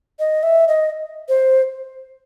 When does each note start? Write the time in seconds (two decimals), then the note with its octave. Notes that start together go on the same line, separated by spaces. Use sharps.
0.19 D#5
0.43 E5
0.68 D#5
1.29 C5